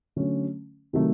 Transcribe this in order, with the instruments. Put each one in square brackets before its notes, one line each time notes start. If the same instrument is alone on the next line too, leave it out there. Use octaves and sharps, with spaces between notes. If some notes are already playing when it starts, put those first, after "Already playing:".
[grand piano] D3 F#3 A3 C#4
C3 D#3 F#3 A3